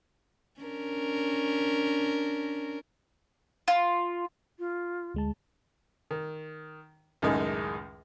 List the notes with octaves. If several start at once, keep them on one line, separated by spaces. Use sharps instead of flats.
C#4 D4 A#4
F4
F4
D2 G#3 A5
D#3
C#2 F#2 A2 D#3 G#3 D#4